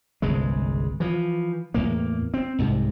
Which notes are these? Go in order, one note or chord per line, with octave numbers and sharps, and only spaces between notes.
G1 C2 C#3 G#3
E3 F3
E2 A2 A#3
C4
C2 G#2 C3